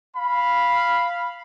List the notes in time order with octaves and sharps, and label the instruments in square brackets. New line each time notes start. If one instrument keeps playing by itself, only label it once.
[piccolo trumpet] F5 [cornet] B5